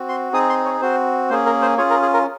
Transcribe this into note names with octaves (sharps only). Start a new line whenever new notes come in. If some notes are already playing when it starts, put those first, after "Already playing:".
Already playing: C4 F#4
C6
C4 D#4 G#4 D#6
C6
C#5
C4 F#4 C5
A#3 C#4 G#4 C5
A#4
C5
C#4 F4 G#4 C#5
A#4
G#4
A#4